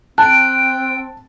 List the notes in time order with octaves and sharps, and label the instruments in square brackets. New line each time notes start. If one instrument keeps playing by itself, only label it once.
[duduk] C4 [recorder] G5 [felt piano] A5 [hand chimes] F#6 D7